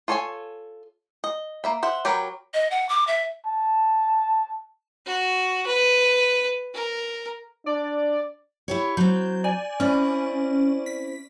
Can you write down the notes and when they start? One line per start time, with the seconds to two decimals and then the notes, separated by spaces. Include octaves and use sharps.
0.08 F4 A4 C#5 D5 G#5
1.24 D#5
1.64 A#3 E5 B5
1.83 C5 E5 F#5
2.05 F#3 G4 A#4 B4
2.54 D#5
2.71 F#5
2.89 D6
3.07 E5
3.46 A5
5.06 F#4
5.67 B4
6.74 A#4
7.66 D4 D5
8.68 E4 G4 C#5
8.97 F#3 C4 G6
9.44 D5 G#5
9.80 C4 C#4 E4 D5
10.86 B6